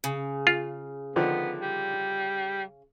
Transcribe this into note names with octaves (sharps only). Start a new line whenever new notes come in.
C#3
F4
D3 D#3 F3 B3
G3